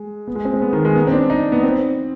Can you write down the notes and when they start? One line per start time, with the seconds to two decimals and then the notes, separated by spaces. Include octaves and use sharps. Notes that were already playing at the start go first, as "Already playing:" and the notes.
Already playing: G#3
0.28 B3
0.35 G#3
0.45 C4
0.54 G#3
0.62 B3
0.73 D#3
0.85 G#3
0.95 B3
1.07 C4
1.12 D4
1.30 D#4
1.52 B3
1.63 C4